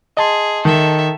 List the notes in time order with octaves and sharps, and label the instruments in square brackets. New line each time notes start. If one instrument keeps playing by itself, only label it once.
[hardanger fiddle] G#4 [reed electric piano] D#5 A5 C6
[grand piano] D#3 [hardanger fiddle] A4 E5